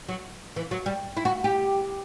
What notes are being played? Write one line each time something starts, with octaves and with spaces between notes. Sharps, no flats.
F#3
E3
F#3
G3
E4
F#4
G4